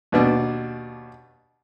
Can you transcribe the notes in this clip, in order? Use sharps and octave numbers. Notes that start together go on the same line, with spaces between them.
D#2 B2 D4